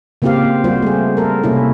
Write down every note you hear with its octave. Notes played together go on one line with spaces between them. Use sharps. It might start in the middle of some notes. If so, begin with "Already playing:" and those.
C#3 A#3 C4 F4 G4 F5
G3 F4 F#4 C5
A3 G#4
A4 A#4
C3 A#3 C#4 E4